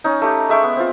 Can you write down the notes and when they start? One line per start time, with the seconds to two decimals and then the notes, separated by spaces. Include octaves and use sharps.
0.04 C#4 D#4
0.21 A3 G4
0.50 G#3 E5 G5 C#6
0.63 B3
0.76 C4 F4